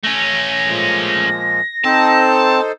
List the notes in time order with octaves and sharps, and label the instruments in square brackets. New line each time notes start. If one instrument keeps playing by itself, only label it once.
[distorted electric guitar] A3 C#4 [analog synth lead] A#6
[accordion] A#2 F3 G#3
[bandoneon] C4 [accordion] D#4 A4 C5 [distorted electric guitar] A5